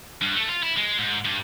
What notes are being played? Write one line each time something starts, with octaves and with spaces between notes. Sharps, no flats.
G2
A3
F4
E4
G#3
G#2
G2